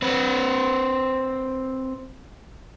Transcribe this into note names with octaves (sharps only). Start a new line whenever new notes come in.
C4 B4